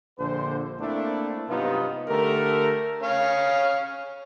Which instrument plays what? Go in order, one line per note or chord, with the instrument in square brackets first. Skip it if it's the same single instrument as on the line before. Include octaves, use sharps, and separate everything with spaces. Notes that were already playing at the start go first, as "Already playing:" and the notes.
[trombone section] A#1 D3 C5
A3 A#3 C4 D4 E4
G2 C3 F#3 B3 D#4 F4
D3 A3 G4 A#4
[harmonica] C#4 C#5 F5